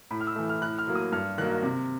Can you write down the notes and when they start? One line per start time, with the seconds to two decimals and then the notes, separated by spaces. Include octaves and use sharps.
0.11 A2 B5
0.21 F6
0.27 E6
0.36 E3 A3
0.49 F6
0.61 A2 F#6
0.79 F6
0.87 F#3 A#3
0.95 D#6
1.12 G2 F6
1.38 D#3 F#3 A#3 F#6
1.63 C3